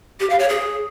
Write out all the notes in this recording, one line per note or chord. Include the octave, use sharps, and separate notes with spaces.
G4
F5
C#5
G#4